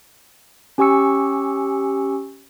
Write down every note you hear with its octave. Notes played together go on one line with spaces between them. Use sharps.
C#4 G4 G#5 C#6 E6 C#7